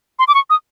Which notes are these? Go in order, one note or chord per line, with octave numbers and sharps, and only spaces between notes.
C6
D6
C#6
D#6